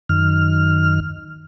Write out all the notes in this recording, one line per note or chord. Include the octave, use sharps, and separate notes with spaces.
F#2 D#3 F6